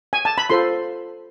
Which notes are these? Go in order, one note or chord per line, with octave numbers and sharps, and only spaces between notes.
G#5
A5
B5
F4 A4 C5 C6